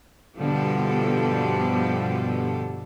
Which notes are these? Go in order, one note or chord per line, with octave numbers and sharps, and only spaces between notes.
G2 B2 D3 F3 G4 A4